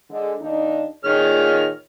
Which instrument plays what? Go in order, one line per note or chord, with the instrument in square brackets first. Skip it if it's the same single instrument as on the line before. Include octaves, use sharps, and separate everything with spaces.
[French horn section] D3 G#3
D#2 D4 D#4
[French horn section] A#2 G#4 [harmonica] D#3 C#5 F6